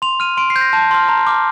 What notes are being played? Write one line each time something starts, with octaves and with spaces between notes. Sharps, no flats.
C6 F7
F6 D#7
C6 D7
C7
G6
A#6
A5 G6
C6 F6
A#5
D6 F6